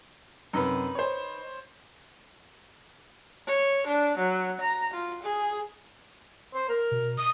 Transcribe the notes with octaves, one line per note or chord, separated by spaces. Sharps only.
F#2 C3 D#4 B4
C5 C#5
C#5
D4
F#3
A#5
F4
G#4
C5
A#4
B2
D#6